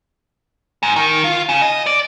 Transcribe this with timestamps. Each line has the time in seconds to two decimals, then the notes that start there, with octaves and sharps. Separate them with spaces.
0.83 G#2
0.96 D#3
1.24 F4
1.49 C#3
1.62 D#5
1.86 D5